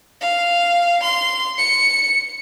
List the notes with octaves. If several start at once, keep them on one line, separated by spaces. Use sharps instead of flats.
F5
C6
C#7